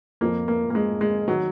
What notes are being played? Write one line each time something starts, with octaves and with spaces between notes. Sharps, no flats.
F2 F3 A#3
A#3
A#3
G#3
G#3
D#3 F#3